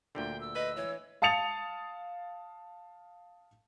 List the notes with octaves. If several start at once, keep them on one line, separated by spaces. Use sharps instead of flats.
D2 A#2 D3 G5
E6
B4 D#5
E3 C#5
F5 A5 D#6 A6 C#7 F7